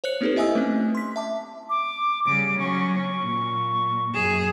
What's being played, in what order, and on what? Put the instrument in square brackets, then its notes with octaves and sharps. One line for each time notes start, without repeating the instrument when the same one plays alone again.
[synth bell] C5 C#5 F#6 C#7
A#3 C4 D#4 G4 A4 B4
E4 D#5 E5 G#5 D#6 E6
A3 C4 C#4
C6 B6
E5 A5 D6
[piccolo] D6
[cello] C#3 G3 [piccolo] D7
[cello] F#3 C#4 [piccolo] C#6
[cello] A#2
[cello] F#2 G#4 [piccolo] E7